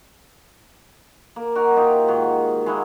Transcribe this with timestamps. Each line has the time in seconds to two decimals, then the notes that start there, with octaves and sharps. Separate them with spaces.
1.36 A#3
1.55 D#4 F#4 A#4
1.76 D#4 F4 G4
2.08 G#2 D#3 F#4
2.66 G#3 A#3 E4 F#4